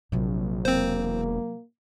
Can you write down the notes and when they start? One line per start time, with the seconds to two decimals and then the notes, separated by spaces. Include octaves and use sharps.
0.12 A#1 C3 F#3
0.65 E1 A#3 C4 C5